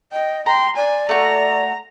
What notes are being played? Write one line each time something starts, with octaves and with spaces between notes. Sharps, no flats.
D#5 G5
G5 A#5 C6
D5 G#5
A3 F#4 A#5